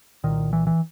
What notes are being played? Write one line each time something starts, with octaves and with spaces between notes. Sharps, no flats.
C2 A#2 D#3
E3
E3